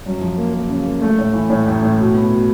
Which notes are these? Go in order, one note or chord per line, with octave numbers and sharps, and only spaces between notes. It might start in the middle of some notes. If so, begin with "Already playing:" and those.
F#2
F3
A#3
A#3
C#3
A#3
A3
A2
E3
A2
A1
A2
B2
B3
B2